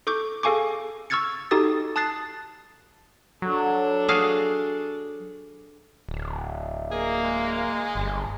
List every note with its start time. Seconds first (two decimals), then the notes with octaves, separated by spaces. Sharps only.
0.07 A4 C#6 D6 G6
0.43 G#4 A4 F5 G#5 C#6 D6
1.10 C#6 E6 F6 G#6 A6 C#7
1.51 D#4 F#4 G4 A4 D#6 A6
1.96 A5 D#6 F#6 A6 C7
3.42 F#3 D4 A4
4.08 F#4 G#4 F5
6.09 D1
6.91 A#3 G#4
7.24 G#3
7.95 G1